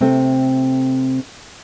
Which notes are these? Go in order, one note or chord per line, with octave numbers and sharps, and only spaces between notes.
C3 A3 C4